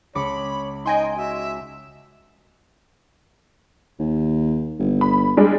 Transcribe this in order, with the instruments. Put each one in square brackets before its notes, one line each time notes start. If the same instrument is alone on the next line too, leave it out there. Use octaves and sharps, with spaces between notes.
[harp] C#2 D6 C#7 [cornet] C#5 [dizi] B5
[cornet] D#4 [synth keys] D#5 G#5 C6 [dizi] G5
[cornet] F#4 [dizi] E5
[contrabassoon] D#2
G1
[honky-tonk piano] B5
G3 G#3 D4